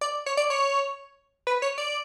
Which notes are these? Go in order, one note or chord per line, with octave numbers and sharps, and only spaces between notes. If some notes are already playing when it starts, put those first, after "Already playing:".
D5
C#5
D5
C#5
B4
C#5
D5